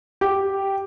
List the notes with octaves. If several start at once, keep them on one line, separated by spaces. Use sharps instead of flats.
G4